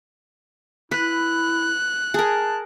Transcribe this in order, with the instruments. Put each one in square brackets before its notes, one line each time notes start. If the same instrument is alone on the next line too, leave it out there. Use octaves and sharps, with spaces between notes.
[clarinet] E4 [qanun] B4 [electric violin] F#6
[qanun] G#4 A#4 [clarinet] A5